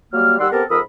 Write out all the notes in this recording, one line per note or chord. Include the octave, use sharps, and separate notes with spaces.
F#3 G3 A#3 F6
D#2 G3 D5 F#5 C6 E6
B3 C4 G4 A4 A#4
F2 G#2 A#4 B5 D#6 E6